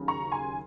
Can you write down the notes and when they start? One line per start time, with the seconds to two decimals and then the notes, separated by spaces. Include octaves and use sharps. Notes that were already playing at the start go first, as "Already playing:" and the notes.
Already playing: D#2 C#3 F#3
0.08 A#5 C#6
0.32 G#5 C6